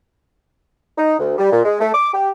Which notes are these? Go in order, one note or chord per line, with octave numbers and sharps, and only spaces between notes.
D#4
D2
G3
A#2
G#3
A3
D6
G4